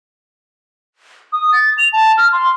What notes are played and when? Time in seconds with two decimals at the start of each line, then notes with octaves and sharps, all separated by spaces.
1.33 D#6
1.53 A6
1.78 F7
1.93 A5
2.18 F6
2.32 C6